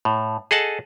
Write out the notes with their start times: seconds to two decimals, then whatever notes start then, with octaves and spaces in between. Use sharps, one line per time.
0.05 A2
0.51 G#4 A4 D#5 F#5 A5